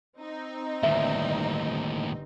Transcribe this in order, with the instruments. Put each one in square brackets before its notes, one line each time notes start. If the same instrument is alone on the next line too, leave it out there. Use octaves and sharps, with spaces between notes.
[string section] C4 D#4
[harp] G1 [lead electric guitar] D#2 A2 [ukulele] E5